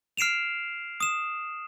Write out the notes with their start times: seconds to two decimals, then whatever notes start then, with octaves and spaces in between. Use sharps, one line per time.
0.17 F6 C7 D7 E7 F7
1.00 D#6 E7